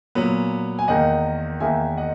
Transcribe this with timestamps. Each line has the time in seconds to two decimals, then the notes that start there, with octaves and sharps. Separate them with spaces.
0.15 A#2 F#3 B3
0.79 G#5
0.88 E2 D#3 A#3 D#5 F#5
1.60 E2 D#3 A#3 E5 G#5
1.97 D#5 F#5